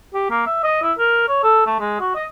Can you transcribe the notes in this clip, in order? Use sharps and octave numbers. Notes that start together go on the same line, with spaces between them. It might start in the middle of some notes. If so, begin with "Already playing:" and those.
G4
A#3
E5
D#5
E4
A#4
C#5
A4
A3
G#3
F#4
D#5